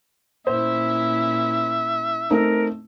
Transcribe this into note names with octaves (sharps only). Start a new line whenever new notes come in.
A#2 C#4 E4 C5 E5
A3 C4 D#4 A#4